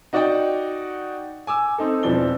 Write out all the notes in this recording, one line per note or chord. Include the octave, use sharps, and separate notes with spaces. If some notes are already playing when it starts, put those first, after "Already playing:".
D#4 F#4 D5 D#5 F#5 G5
G#5 D6 E6
C4 D#4 A4
E1 E3 F3 C4 D5 G7